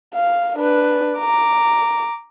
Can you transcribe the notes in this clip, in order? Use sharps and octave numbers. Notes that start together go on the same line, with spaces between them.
F5
D4 B4
A#5 D6